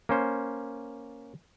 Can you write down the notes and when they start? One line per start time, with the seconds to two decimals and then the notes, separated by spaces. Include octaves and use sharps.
0.09 A#3 C#4 C5